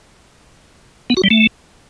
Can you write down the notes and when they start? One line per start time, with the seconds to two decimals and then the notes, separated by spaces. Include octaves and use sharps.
1.10 B3
1.17 F#4
1.24 G3
1.31 A3